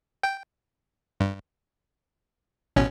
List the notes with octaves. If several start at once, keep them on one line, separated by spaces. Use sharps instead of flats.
G5
G2
A1 B2 C#4